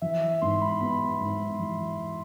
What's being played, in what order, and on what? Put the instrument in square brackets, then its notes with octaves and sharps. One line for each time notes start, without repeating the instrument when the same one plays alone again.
[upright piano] E3 [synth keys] E5
[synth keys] E5
[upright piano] G#2 [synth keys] C6
[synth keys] B5
[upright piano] B3 [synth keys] B5
[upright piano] G#2
E3